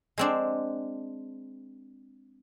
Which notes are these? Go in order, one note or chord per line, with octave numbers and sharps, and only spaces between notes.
G#3 C4 D4